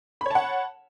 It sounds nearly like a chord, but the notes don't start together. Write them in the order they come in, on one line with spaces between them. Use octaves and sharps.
B5 C#5 A5 F#5